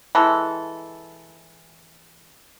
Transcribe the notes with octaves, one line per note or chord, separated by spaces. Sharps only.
E3 G#3 A4